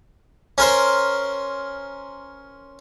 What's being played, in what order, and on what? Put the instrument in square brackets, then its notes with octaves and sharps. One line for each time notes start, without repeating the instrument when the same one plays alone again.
[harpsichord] C#4 A#4 C5